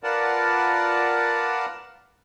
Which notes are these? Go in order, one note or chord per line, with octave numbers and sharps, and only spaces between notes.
F4 A#4 B4 D5 F#5 A5